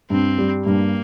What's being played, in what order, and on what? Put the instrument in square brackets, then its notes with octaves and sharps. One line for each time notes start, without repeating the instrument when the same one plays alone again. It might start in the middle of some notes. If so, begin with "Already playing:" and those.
[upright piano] G2 [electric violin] C4
[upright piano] G3
[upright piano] G2 [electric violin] A#3